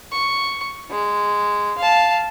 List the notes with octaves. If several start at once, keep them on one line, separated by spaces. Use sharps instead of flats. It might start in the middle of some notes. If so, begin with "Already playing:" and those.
C#6
G#3
F5 A5